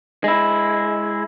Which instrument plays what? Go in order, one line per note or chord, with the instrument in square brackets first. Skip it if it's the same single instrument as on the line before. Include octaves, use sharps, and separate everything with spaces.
[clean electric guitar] G#3 E4